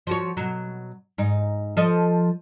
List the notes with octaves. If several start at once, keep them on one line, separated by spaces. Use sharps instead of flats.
F3 F#4 C#5
B2 F#3
G#2 D#4
F3 A4 D#5